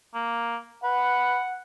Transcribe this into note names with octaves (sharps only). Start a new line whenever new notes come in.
A#3
B4 F#5